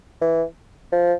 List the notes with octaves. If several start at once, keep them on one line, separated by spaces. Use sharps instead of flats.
E3
F3